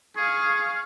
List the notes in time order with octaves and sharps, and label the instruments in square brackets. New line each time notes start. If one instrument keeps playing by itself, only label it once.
[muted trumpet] G#4 [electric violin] F5 C#6